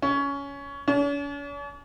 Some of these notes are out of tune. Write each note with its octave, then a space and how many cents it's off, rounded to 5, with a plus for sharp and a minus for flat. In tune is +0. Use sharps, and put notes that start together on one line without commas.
C#4 +15
C#4 +45